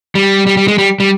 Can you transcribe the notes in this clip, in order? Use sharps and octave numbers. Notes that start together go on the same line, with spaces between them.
G3
G3
G3
G#3
G3
G3